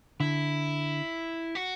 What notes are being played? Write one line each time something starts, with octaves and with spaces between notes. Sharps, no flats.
D3 E4
F#4